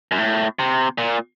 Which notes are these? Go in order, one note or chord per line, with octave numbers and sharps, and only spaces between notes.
F#2
A2
C3
A#2